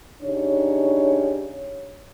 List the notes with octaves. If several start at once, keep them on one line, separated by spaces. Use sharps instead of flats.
C#3 D4 D#4 G4 C#5